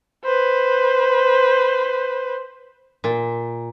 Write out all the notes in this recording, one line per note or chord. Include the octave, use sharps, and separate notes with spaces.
B4 C5
A#2